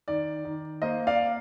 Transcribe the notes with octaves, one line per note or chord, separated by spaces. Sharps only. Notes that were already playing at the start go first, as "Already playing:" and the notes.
D#3 D5
D#3
A#3 C5 D#5
D5 F5